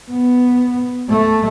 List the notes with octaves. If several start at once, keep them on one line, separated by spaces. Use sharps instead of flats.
B3
A3